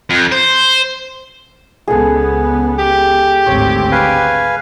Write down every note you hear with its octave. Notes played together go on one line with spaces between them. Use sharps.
F2
C5
C#2 B3 G#4 A4
G4
G#1 D2 C4 C#5
B4 F5 G#5